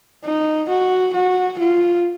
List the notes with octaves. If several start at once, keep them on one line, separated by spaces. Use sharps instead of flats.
D#4
F#4
F#4
F4